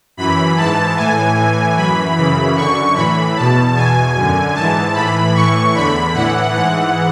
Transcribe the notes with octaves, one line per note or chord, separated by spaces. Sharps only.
F#2 E3 B5
G#2 E3 A5
A2 E3 G#5
A2 E3
F#2 E3 B5
F#2 C#3 E3 B5
F#2 D3 C#6
A2 E3 B5
E2 B2 A5
E2 B2 G#5
F#2 D3
G#2 E3 A5
A2 E3 B5
A2 E3 C#6
E2 D3 B5
A2 E3 F#5
G#2 E3 F#5